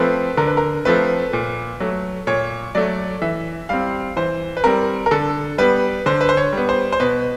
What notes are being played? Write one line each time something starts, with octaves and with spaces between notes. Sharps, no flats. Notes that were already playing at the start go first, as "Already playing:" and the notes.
Already playing: F3 A3 C4 B4
D3 A#4
B4
A#4
F3 A3 C4 B4
A#2
F#3 A3
A#2 C#5
F#3 A3 D5
E3 E5
G3 C4 F5
E3 C5
B4
G3 C4 A#4
A#4
D3 A4
G3 B3 B4
D3 C5
B4
C5
C#5
G3 B3
C5
C5
B2 B4